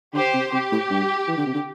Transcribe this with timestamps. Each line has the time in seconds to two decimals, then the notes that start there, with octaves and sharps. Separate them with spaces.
0.14 D3 G4 C5
0.34 C3
0.53 C3 G4
0.72 A2
0.91 G2
1.28 E3
1.38 D3
1.46 C3
1.55 D3